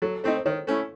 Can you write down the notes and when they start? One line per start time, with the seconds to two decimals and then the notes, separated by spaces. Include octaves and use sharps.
0.02 F#3 A4
0.23 A3 C4 D#4 C5
0.37 C5
0.46 D#3 C#5
0.67 A3 C#4 E4